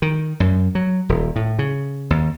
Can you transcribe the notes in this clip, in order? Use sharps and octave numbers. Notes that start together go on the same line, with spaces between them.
D#3
F#2
F#3
D#1
A2
C#3
D#2